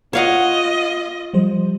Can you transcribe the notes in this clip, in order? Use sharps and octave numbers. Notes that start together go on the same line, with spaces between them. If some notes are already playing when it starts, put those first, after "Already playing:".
F4 C#5 D#5 F5 F#5
F3 G3 C5